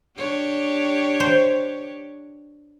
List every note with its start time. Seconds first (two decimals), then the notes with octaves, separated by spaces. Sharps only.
0.17 D4 G4 C#5
1.20 C5